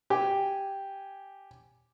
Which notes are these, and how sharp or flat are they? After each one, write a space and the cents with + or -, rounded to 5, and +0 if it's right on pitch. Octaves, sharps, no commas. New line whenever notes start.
G4 +0 G#5 +0